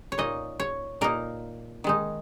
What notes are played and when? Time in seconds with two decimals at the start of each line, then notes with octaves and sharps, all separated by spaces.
0.12 C#5
0.18 A#2 A#3 D#4 D#5
0.60 C#5
1.01 A#2 A#3 D#4 A#4
1.84 D#3 G#3 D#4